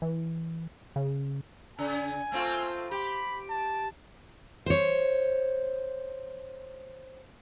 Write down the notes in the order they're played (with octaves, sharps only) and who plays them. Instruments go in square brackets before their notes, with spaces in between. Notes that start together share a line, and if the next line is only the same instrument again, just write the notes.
[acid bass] E3
C#3
[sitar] C#3 [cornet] G#5
[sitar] A3 C4 F4
[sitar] G4 [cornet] B5
[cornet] A5
[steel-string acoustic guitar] C5 C#5